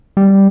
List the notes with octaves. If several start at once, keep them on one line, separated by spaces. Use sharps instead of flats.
G3